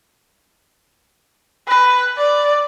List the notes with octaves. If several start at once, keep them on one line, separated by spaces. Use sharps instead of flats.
B4
D5